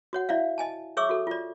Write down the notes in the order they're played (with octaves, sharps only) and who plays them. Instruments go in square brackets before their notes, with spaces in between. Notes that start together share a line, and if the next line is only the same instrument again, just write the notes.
[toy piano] F#4 C#5 F#5
E4 D5 E5 F5
D#5 G#5 A5
G#4 C#5 E5 C#6 D6 E6
F#4 A4
F4 D5